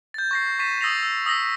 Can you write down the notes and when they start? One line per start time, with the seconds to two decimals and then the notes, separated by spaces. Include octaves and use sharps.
0.14 G6 A6
0.31 C#6 A#6 C7
0.59 C#6 A6 B6 D#7 E7
0.81 D#6 E6 A6 A#6 C7 F7
1.03 E6
1.26 D#6 E6 A#6 B6